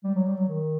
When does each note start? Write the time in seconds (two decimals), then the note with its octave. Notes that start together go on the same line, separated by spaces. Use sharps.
0.04 G3
0.15 F#3
0.26 G3
0.37 F#3
0.48 D#3